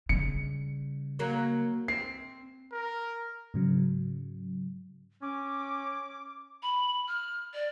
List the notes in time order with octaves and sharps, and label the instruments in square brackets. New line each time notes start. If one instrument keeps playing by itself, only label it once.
[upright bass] C#3 G3 [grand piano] C#7
[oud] F#3 A#3
[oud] C4 [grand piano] C7
[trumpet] A#4
[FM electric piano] G#2 C#3 F#3
[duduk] C#4 [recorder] D6
[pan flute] B5
F6
D5